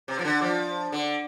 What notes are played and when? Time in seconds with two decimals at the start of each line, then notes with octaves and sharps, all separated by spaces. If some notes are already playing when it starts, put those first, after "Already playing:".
0.08 C3
0.19 F3
0.25 D3
0.42 F3
0.92 D3